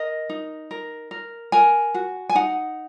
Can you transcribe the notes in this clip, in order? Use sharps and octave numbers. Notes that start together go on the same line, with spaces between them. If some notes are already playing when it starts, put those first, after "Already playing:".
Already playing: A#4 D#5
D#4
A#4
A#4
A#4 G#5
F#4
G#5
D#4 F#5